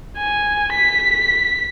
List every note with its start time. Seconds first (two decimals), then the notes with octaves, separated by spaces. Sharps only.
0.18 G#5
0.73 B6